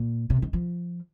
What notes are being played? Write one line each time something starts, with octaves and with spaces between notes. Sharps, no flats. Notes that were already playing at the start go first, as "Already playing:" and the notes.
Already playing: A#2
C3
D#3
F3